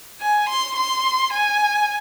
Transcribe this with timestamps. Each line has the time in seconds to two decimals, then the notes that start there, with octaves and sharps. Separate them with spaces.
0.21 G#5
0.49 C6
0.77 C6
1.33 G#5